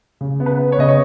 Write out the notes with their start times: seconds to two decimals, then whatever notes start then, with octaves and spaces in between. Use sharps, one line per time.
0.21 C#3
0.40 B3
0.46 B4
0.59 B3
0.72 C#5
0.78 C#3 D#5
0.89 C#5